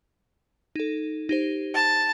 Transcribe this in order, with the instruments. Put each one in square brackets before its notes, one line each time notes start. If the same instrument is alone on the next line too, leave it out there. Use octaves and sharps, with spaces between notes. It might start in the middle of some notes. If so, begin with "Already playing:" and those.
[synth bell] D#4 A4
D#4 G4 C5
[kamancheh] A5